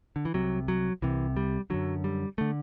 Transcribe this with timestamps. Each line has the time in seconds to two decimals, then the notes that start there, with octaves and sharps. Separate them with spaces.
0.16 D3
0.25 E3
0.34 C2 C3 F#3
0.68 F#3
1.02 C2 C3 E3
1.36 G3
1.70 F#2 D3 F#3
2.04 G3
2.38 D3 A3